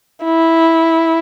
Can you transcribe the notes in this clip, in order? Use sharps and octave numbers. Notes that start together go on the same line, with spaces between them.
E4